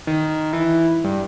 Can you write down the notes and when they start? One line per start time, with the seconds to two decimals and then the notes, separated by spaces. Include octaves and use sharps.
0.07 D#3
0.53 E3
1.04 G2